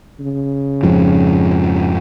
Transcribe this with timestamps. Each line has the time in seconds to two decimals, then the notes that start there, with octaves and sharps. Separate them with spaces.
0.20 C#3
0.83 F2 G#2 F3